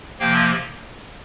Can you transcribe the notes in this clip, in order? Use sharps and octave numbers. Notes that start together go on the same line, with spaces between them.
C3 F3 A#3 F5 G5